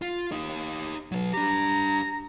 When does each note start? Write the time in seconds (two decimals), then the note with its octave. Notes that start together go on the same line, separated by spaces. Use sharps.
0.02 F4
0.32 D#4 G4
1.12 F#3 B4
1.33 D4 G4 A#5